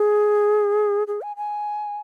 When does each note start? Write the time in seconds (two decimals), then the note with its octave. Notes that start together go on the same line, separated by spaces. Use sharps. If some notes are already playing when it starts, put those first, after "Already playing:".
Already playing: G#4
1.08 G#4
1.22 G#5
1.37 G#5